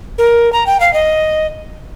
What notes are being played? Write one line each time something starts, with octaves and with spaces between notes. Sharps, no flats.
A#4
A#5
G5
F5
D#5